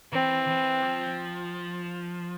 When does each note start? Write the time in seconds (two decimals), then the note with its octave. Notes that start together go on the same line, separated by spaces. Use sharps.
0.13 E3 C4
0.48 E3
0.82 F3